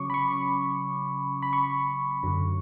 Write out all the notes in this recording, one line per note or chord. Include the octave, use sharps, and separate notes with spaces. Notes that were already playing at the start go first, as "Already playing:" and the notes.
Already playing: C#3 F#3 C#4 C#6 D6
B5
C#6
B5
C#6
F#2 D3 F#3